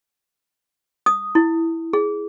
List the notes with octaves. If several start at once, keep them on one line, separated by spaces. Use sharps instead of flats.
D#6
E4
G#4